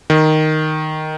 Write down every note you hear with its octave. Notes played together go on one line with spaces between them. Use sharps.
D#3